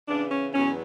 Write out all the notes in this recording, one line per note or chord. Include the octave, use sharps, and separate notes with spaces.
C#3 E3 B3 D4
C#4
E2 B2 F#3 B3 C#4